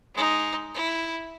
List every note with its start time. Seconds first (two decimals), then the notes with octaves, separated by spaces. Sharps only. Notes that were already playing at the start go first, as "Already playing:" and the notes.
0.14 G#3 D#4
0.75 E4